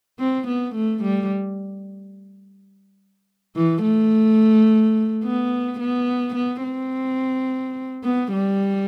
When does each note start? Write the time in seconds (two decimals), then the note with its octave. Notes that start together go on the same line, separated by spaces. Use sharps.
0.20 C4
0.48 B3
0.75 A3
1.03 G3
3.56 E3
3.84 A3
5.24 B3
5.80 B3
6.35 B3
6.63 C4
8.04 B3
8.33 G3